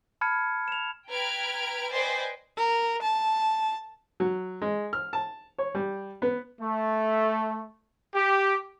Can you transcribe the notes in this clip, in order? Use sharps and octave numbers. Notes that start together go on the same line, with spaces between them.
A5 B5 F6 G#6 C#7
E7 F7
B4 G5 A#5 F6 G#6 D7
B4 C5 D5 D#5 G5 G#5
A#4
A5
F#3
G#3
F6
A5
C#5
G3
B3
A3
G4